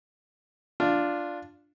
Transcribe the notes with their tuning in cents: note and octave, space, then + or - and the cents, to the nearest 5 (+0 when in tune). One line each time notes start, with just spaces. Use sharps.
D4 +0 F4 +0